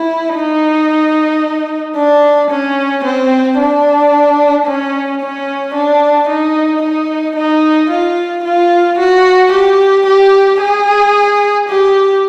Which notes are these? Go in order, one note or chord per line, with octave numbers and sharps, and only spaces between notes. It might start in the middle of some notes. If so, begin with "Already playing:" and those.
Already playing: E4
D#4
D4
C#4
C4
D4
C#4
C#4
D4
D#4
D#4
D#4
F4
F4
F#4
G4
G4
G#4
G4